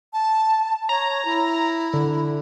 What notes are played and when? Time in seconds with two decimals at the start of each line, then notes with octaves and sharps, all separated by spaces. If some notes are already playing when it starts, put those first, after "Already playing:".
0.13 A5
0.89 C#5 A#5
1.25 E4
1.93 D3